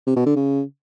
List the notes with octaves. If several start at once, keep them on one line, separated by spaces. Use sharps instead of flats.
C3
B2
D3
C#3